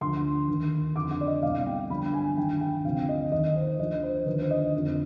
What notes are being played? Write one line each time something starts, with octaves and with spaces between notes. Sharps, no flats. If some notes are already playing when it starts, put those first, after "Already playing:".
D2 D3 F3 C6
D#2 D#3
F2 D3 F3 D6
D6
D5
D#5
C2 B2 F5
G5
G2 D3 F3 B5
G#5
G2 D#3 G5
G5
D2 C3 F3 F5
D#5
D#2 D#3 D#5
C5
D2 D3 F3 D#5
C5
D#2 D3 F3 B4
C5
D#5
F2 D3 F3